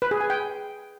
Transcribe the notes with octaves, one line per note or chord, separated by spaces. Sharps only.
B4
G#4
G#5
G5